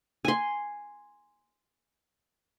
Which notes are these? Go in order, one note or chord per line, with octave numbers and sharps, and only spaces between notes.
G#5 C6